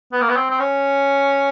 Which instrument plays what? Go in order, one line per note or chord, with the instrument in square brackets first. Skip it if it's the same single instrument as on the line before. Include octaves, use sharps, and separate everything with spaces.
[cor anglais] B3
A#3
B3
C4
C4
C#4